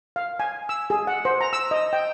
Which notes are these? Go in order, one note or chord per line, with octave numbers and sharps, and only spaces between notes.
F5
G#5
E6
G#4
F#5
C5
A#5
E6
D#5
G5